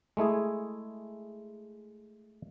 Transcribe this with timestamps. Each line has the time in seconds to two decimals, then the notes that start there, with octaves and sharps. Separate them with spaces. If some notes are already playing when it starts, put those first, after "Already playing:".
0.17 G#3 A3 E4 G#4